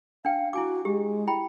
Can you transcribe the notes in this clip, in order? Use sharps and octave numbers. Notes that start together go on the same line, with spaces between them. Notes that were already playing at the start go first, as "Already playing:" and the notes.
D4 F5 G5
E4 F#4 G#5 D6
G#3 G4
E4 G5 B5